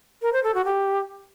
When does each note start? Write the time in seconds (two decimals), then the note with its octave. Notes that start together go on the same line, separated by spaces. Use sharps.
0.22 A#4
0.33 C5
0.44 A4
0.54 F#4
0.65 G4